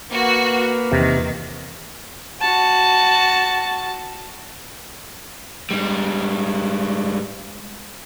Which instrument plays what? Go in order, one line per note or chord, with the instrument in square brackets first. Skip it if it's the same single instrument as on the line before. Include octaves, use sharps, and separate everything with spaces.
[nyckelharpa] A#3 B4 [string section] F#4
[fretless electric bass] E2 [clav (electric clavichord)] C3 [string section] D#3
[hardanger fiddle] F#4 A5
[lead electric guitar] G#2 G3